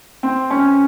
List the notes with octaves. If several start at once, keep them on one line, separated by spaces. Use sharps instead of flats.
C4
C#4